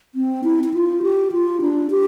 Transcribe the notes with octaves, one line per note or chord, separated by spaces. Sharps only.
C4
E4
E4
F4
G4
F4
D4
G4